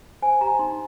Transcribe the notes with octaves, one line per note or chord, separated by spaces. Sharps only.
C5 G#5
G4 A#5
D#4 C6